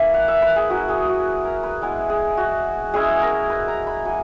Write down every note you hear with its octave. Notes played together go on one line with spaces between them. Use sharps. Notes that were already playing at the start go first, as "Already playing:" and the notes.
Already playing: A#3 C#4 E4 E5
F#5
E5
B4
G#4
F#3 C#4 E4 F#4
G#4
F#4
A#4
B4
G#3 B3 E4 G#4
G#4
F#4
G#3 C#4 E4 G#4
A#4
B4
A#5
B5
F#3 A#3 G#5